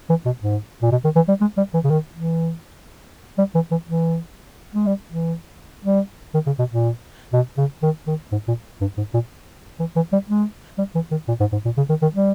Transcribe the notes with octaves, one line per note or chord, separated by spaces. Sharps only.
E3
B2
G#2
A#2
B2
D#3
E3
G3
G#3
G3
E3
C#3
D#3
E3
G3
E3
E3
E3
G#3
G3
E3
G3
D#3
C#3
B2
A#2
B2
C#3
D#3
D#3
G#2
A#2
G2
G#2
A#2
E3
E3
G3
G#3
G3
E3
D#3
A#2
G#2
G#2
A#2
C#3
D#3
D#3
G3